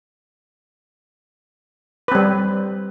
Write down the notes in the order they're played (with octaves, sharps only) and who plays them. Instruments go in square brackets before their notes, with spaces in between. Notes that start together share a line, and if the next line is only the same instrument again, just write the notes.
[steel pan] B4
C4
G3